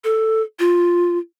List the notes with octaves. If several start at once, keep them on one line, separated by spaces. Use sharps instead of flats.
A4
F4